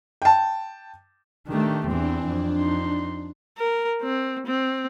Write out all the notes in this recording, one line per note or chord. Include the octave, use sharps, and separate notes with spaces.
G5 A5
D#3 A3 D4 G4
E2 E3 C4 D4
F2
D#4 C6
A#4
C4
C4